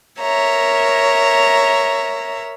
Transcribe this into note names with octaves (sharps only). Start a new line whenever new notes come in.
A#4 C#5 E5 A#5